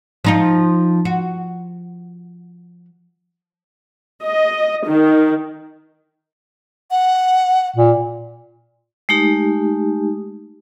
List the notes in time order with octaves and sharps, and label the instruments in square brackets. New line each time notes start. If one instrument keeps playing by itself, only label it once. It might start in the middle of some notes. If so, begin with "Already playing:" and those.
[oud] F3 D#4 F4
F#4
[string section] D#5
D#3
[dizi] F#5
[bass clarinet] A#2
[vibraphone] G#3 A3 D#4 G4